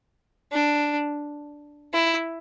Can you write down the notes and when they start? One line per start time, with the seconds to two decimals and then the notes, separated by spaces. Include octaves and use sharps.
0.52 D4
1.93 E4